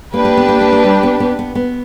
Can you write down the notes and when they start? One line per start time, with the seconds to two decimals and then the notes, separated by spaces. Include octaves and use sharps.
0.14 A#3 D4 G4 B4
0.25 A#3
0.37 B3
0.48 A#3
0.61 A#3
0.73 A#3
0.84 G3
1.03 B3
1.20 B3
1.39 B3
1.55 B3